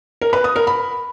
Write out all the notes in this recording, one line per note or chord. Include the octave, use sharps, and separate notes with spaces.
A#4
B4
D#6
A#4
B5